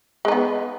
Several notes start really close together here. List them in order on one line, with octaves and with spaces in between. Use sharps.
G#3 D#4 B3